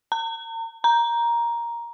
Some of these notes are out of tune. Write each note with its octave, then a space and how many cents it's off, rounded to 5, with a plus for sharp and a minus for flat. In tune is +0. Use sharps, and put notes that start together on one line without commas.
A#5 -40
A#5 +10